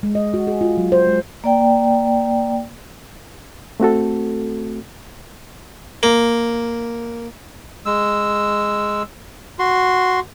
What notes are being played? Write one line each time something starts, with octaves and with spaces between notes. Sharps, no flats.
G#3
D#5
F#4
G#4
F4
F#3
C5
G#3
A#3 D5 G5
A3 C4 F#4 A4
A#3
G#3 E6
F#4 C6